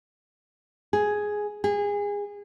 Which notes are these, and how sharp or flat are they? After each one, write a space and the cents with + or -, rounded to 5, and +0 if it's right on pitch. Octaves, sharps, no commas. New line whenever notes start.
G#4 +5
G#4 -25